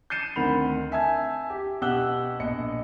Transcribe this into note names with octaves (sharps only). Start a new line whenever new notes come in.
G6 A6 C7 C#7 D#7 E7
D2 D#3 C4 F#5 B5 F7
E5 G#5 A5 E6 G#6
G4
B2 G4 F#5 E6 F#6 G7
A#1 D#5 C#7